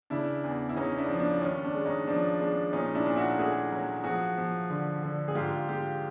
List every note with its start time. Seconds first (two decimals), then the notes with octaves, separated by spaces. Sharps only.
0.10 C#3 D4 E4
0.44 E2
0.69 E4
0.76 C#3 C#4 D#4
0.98 D4 E4
1.09 F3
1.20 D4
1.42 D#2 C#4
1.64 D4
1.75 G#3
1.86 C#4 D#4
2.07 F3 D4
2.40 G#3 D4
2.73 A#2 C#4 D#4
2.95 D4 E4
3.06 A#2
3.16 E4 F#4
3.39 A3 F#4 G#4
3.72 F#3
4.04 F3 F#4 G#4
4.38 F3
4.70 D3
5.03 D3
5.28 G#4
5.35 G#2 F4 G4
5.69 G#3 F4 G4